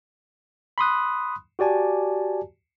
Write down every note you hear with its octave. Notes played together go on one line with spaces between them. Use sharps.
B5 C6 D#6 F#6
F#4 G4 D5 G#5 A5